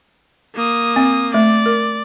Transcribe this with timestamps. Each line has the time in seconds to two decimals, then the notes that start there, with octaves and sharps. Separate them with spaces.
0.55 A#3 D#6
0.96 C4
1.34 A3 D5
1.66 A#4